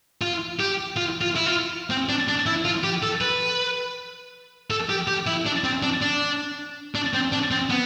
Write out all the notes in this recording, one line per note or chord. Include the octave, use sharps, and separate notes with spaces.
F4
G4
F4
F4
E4
F4
C4
D4
D4
E4
F4
G4
A4
B4
A4
G4
G4
E4
D4
C4
D4
D4
D4
C4
D4
C4
B3